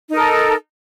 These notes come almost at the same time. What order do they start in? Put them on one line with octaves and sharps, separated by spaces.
D#4 A#4 A4